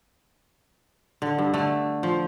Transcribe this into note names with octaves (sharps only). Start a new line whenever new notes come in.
D3
G2
D3 A3
F3